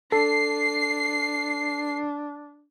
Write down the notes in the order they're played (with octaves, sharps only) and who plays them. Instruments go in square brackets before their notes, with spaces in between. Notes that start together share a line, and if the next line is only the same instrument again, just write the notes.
[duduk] D4 [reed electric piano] A4 [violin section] C7